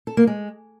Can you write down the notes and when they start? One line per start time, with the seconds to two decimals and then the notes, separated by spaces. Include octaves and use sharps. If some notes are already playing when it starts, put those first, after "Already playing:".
0.07 A4
0.17 A#3
0.27 G#3